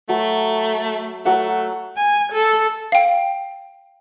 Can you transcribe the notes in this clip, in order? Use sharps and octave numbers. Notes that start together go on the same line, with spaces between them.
F#3 A3
F#3 A3 F#5
G#5
A4
F5 G5